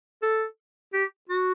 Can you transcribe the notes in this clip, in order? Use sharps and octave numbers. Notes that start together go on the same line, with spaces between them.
A4
G4
F#4